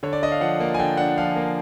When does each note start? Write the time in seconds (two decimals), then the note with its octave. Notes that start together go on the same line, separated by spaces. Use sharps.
0.03 D3 C#5
0.13 D5
0.22 D4 D#5
0.32 F5
0.41 F3 F#5
0.60 A#3
0.74 G#5
0.79 D3 G5
0.97 D4 F#5
1.17 F3 F5
1.36 A#3